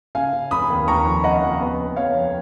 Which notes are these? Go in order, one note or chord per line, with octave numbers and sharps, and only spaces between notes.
C#3 F5 G#5
C#3
F1 B5 D#6
D#2
D#2 A#5 C#6
F3
C#3 D#5 F#5
F3
B3
B3
F2 C#5 F5
F2